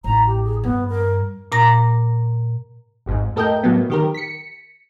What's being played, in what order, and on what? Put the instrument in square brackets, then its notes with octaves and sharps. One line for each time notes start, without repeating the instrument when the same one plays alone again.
[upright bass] A1 [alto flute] A#5
[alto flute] G4
G#4
[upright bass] G2 [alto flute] B3
[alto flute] A#4
[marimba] A#2 A#5 A#6
[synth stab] G#1 F2 G#2
A2 A4 A#4 D#5 G5 G6
A2 F#3 A#3 B3
D#3 G4 A#4
B6 C#7